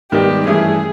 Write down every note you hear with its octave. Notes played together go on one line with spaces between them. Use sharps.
G#2 D#3 G3 B3 D#4 G4
G2 E3 A3 C#4 E4 G#4